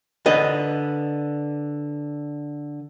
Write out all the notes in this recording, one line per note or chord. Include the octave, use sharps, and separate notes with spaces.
D3 B4 D#5